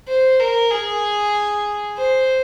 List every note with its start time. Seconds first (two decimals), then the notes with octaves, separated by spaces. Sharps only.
0.08 C5
0.40 A#4
0.72 G#4
1.98 C5